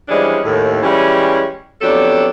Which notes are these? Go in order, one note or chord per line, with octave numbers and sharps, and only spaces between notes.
E3 F3 G3 G#3 C#4 D4
D#2 A2
E3 G3 G#3 C#4
F2 F#3 B3 D4 G4 A4